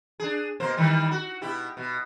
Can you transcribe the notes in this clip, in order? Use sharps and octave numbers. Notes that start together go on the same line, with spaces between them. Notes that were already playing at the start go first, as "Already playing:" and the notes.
D4 G#4
B2 A#3 C5
D#3 E3 G3
F#4
B2 E4 G4
B2